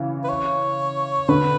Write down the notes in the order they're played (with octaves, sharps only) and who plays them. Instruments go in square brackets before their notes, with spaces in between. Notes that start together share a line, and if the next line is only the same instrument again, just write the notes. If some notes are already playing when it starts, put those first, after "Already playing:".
Already playing: [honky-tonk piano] C#3 E3
[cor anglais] B4
C#5
[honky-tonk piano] D3 [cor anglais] B4